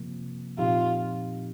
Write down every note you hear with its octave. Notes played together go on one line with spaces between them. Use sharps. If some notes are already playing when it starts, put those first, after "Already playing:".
Already playing: C3 F3 A#3
A#2 F3 C4 D#4 F4 G4